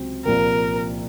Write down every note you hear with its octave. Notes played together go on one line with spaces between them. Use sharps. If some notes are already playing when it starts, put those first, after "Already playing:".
Already playing: C#2 C3 F#3 C4
C2 A#2 F3 A#4